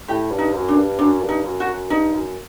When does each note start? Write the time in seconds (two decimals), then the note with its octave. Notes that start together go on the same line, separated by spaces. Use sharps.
0.08 A2 G4
0.31 G2
0.39 D#4
0.54 F#2
0.68 D4
0.76 G2
0.99 F#2 D4
1.22 G2
1.29 D#4
1.44 F#2
1.60 F#4
1.67 F#2
1.90 G2 D#4
2.13 F#2